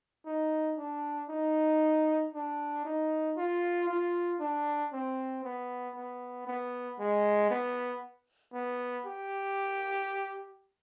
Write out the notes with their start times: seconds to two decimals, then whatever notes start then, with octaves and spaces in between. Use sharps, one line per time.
0.26 D#4
0.78 D4
1.29 D#4
2.34 D4
2.85 D#4
3.37 F4
3.88 F4
4.40 D4
4.93 C4
5.44 B3
5.96 B3
6.47 B3
6.99 G#3
7.50 B3
8.54 B3
9.06 G4